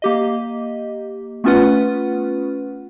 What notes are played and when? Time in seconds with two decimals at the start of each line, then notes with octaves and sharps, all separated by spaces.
0.02 A#3 G4 D#5
1.44 A3 B3 C#4 F4 B4 F#5